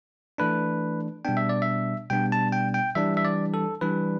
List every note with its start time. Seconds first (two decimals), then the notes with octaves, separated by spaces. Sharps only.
0.38 E3 A3 D4 B4
1.25 B2 G3 B3 D4 G5
1.37 E5
1.49 D5
1.62 E5
2.10 B2 G3 B3 D4 G5
2.32 A5
2.52 G5
2.74 G5
2.95 E3 G3 D4 E5
3.17 E5
3.24 D5
3.54 A4
3.81 E3 G3 D4 B4